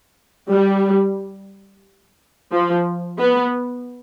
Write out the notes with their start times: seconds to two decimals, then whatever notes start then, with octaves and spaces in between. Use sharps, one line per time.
0.50 G3
2.52 F3
3.19 B3